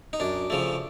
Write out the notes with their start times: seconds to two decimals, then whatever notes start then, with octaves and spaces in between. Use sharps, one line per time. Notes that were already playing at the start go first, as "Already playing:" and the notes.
0.13 D#4
0.20 F#2 D4
0.50 C#3 F3 A3